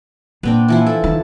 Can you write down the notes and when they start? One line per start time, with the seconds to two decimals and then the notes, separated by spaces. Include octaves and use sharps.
0.43 A#2 B3 C4 D4
0.68 E3 F3 E4
0.87 A4
1.04 D#3 A5